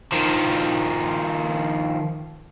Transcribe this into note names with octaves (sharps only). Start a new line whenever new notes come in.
D#3 F3